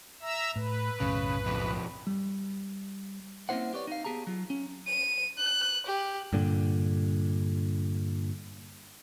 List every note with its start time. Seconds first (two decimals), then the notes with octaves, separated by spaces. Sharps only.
0.22 E5 A#5 E6
0.56 A2 B4
1.00 B1 F#2 A2 C#3
1.46 F2 B2
2.07 G3
3.49 A#3 C4 C#4 E4 C5 F#5
3.73 G4 B4 C#5 D5
3.87 D#4 F5
4.05 B3 G4 G#4 A5 A#5
4.27 F#3 F4
4.50 C#4
4.87 D#7
5.38 F#6
5.86 G4
6.33 G2 A#2 D3